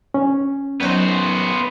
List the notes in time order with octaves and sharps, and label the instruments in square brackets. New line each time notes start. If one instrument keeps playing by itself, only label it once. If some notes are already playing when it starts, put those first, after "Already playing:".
[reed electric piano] C#4
[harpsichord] F#2 F#3 D#4 [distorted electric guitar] B3 C5